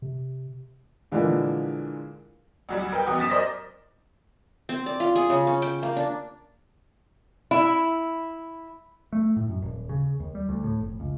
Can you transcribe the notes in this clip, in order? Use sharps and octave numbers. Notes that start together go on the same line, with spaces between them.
C3
A#2 D3 E3 F3 G#3 A#3
D2 F#3 G3
A#4 B4 G5
B1 E2 F#4 D#6
F#2 D#6 A6 B6 E7
A#4 C5 D5 D#5 D6 A#6
C4
D5
F4
G#4
C#3
C#4
G5
A#3
D4
E4
A3
A2
F#2
D#1
C#3
D#2
G3
D2
A2
F1
C#2